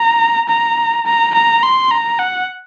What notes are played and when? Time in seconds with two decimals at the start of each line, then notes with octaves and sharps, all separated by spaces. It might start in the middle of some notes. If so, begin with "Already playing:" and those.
Already playing: A#5
0.49 A#5
1.06 A#5
1.35 A#5
1.63 C6
1.91 A#5
2.19 F#5